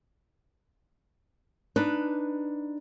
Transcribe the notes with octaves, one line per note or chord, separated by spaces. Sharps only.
D4 D#4 B4